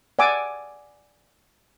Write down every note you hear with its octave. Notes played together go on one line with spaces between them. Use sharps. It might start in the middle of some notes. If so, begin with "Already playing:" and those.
D5 F#5 G#5 D6 E6